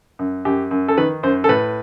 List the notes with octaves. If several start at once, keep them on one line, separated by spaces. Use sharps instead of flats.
F#2
F#2 G4
F#2
A4
D#3 B4
F#2 C5
A4
A2 B4